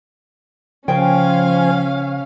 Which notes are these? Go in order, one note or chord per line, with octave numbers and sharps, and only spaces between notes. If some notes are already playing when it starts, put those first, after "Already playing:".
C#3 F3 C#4 C5 C#5 F5 G5 G#5